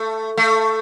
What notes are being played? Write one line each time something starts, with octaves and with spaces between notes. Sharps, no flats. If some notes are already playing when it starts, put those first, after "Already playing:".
Already playing: A3
A3